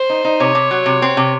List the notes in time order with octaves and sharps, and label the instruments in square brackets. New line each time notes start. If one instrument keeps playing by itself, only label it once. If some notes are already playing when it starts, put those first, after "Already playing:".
Already playing: [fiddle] C5
[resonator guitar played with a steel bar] D#4
D#4
[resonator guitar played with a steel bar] C3 [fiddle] C#5
[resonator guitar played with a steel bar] C3
F#3
C3
C4
C3